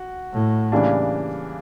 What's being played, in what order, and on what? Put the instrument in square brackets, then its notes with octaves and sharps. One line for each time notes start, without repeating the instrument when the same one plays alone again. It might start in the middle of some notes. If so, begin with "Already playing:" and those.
Already playing: [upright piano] F#4
[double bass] A2
[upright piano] C#3 E3 G3 A#3 D4